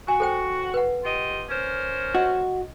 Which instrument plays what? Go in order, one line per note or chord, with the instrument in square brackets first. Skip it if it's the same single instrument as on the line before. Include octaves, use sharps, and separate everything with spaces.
[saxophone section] F#4 [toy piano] G#5
[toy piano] A4 C5 G5
B4 F#5
[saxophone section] F4 G4 D#5
C#4 A#4 C5
[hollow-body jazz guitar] F#4 [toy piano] D#5